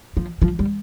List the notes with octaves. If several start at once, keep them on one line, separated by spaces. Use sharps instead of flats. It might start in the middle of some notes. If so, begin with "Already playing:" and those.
F3
F3
G3